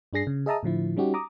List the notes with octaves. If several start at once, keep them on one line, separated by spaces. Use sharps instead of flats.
G2 D4 G#4 A#6 C7
C#3
G#4 D#5 E5 A5 A#5 D#6
A2 D3 F3 E4
G3 C#4 D#4 F#4 G4
A#5 D6 D#6